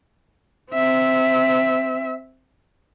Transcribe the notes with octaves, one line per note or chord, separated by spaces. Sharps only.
C4 E5